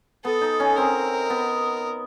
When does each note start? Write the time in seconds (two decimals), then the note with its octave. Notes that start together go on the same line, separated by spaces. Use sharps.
0.25 B3 A4
0.41 D#4
0.60 C#4
0.77 C4 A#4
1.30 B3